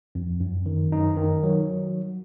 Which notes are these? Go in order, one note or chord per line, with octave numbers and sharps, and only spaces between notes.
F2
F#2
D#3
F#2 D#4
D#3
F#3